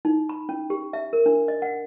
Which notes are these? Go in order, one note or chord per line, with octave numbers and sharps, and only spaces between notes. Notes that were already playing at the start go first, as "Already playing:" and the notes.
D#4
B5
C#4
G4
E5
A#4
D4
D#5
F#5